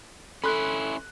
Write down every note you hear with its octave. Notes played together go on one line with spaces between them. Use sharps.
C#4 E4 A4 B5 C6 F#6